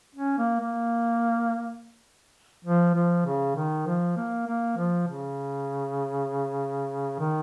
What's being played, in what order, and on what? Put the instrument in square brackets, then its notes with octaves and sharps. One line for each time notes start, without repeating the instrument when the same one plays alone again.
[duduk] C#4
A#3
A#3
F3
F3
C#3
D#3
F3
A#3
A#3
F3
C#3
D#3